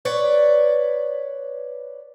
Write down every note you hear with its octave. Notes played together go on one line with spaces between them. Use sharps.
B4 C#5 D5